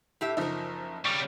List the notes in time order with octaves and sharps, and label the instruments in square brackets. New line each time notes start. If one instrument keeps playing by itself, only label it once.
[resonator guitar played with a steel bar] A2 G4 E5
[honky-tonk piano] F#1 F3 E5 [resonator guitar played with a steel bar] D#4 A#4
[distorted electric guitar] C#3 G3 [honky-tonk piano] C#6 D6 F6